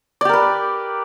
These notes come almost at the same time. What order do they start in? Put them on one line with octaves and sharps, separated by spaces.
D5 G4 A#4 B4